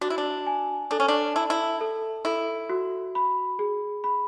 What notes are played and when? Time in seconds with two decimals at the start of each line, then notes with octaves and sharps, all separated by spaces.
0.01 D4 F#4
0.10 E4
0.18 D4
0.47 G#5
0.91 D4 A4
1.00 C#4
1.08 D4
1.36 E4 A5
1.50 E4
1.81 A4
2.25 E4 A4
2.70 F#4
3.15 B5
3.59 G#4
4.04 B5